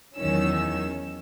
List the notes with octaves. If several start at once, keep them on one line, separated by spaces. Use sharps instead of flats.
E2 D#3 F#3 C#4 E6